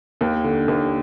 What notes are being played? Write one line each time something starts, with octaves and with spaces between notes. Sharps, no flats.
D#2
D3
D#2